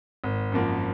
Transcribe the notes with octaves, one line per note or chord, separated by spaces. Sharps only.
G#1
F#2 F3 A#3